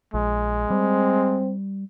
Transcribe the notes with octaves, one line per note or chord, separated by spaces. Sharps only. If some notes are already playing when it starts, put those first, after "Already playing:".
A#1 G#3
G3 C4